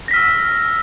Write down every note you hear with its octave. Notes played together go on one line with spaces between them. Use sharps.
E6 F6 A#6 B6